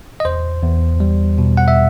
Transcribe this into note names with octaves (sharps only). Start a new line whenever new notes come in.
D#5
E2 C5
E2
G3
B2
F#5
E5